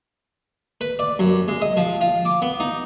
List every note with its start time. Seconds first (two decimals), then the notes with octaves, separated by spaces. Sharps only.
0.81 B4
0.99 D5
1.19 F#2
1.48 G#3
1.62 D#5
1.77 F3
2.01 F4
2.25 D6
2.42 B3
2.60 D#4